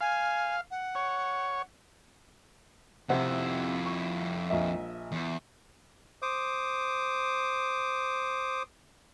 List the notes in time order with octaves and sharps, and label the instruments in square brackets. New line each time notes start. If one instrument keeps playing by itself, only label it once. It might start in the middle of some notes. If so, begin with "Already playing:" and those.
[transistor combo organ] F5 [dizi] G#5
[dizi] F#5
[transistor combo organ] C#5
[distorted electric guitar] F2 E4 [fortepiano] C3 F#5
[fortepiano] C#6
A#1 D#5 E5
[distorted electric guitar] E2
[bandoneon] C5 D6 D#6